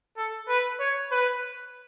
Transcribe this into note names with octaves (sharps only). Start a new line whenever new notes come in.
A4
B4
C#5
B4